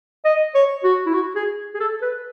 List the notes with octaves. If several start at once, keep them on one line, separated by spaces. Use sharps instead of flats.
D#5
C#5
F#4
E4
F#4
G#4
G#4
A4
B4